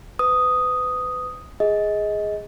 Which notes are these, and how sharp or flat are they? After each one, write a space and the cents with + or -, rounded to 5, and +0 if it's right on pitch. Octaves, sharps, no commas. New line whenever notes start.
B4 +35 D#6 +0
G#4 +0 D#5 +20